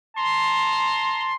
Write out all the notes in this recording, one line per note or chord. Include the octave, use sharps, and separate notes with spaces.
A5 A#5 C6